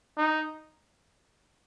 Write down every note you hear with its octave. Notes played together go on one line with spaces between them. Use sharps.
D#4